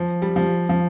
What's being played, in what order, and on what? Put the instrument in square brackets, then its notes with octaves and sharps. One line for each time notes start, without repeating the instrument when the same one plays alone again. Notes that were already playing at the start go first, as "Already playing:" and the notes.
Already playing: [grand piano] F3
G3
F3
F3